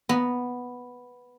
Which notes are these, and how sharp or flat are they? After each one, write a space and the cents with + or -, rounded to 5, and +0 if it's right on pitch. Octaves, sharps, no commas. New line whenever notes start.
B3 +0 A#5 +0